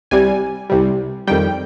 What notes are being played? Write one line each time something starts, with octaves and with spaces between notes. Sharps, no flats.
C2 C3 G3 G#5
C2 C3 G3
F2 D#3 G3 G5